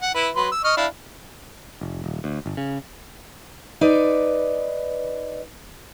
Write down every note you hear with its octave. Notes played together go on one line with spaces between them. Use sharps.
F#5
E4 B4
F#3 B4 C6
E6
D#5 C#6 F6
D4 E4 F5
F1
D#1
D2
G1
C#3
D#4 B4 D5